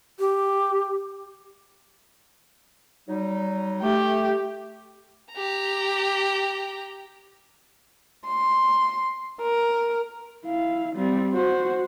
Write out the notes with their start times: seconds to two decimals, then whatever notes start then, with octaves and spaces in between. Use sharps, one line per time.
0.20 G4
3.08 F#3 G3 D#4
3.83 A3 G4
5.33 G4 A#5
8.27 C6
9.42 A#4
10.46 E4 F5
10.96 G3 C4
11.33 F#4 C5